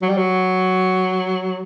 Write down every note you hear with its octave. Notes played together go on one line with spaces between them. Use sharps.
F#3
G3
F#3